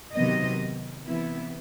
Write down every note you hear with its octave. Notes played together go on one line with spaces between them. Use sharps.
C3 D#3 F#3 B3 D#5
C3 E3 B3 E4